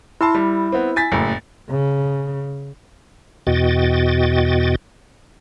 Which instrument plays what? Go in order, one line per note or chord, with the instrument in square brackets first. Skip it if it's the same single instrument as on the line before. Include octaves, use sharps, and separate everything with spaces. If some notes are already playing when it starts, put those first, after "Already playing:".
[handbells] E4 [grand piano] A5 C6 E6
[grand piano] G3
B3 C4
G#5 A6 B6
F#1 A2
[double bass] C#3
[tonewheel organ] E2 B2 F#4 D#5 G5 A6